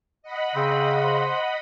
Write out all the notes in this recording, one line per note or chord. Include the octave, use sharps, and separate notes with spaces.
D#5 F#5 B5
C#3 C4
C5